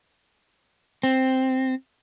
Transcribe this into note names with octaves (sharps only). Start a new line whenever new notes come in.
C4